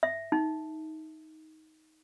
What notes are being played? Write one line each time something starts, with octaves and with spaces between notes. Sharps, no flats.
E5
D#4